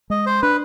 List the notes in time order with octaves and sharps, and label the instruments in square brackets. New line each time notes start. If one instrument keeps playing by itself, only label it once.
[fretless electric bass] G#3 [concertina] D#5
[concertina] C5
[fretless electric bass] D4 [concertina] B4